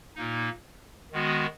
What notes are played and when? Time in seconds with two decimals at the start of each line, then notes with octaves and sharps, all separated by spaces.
0.16 A#2 A#3 D#4
1.12 D#3 G#3 B3 F#4